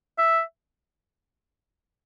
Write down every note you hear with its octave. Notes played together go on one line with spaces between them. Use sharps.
E5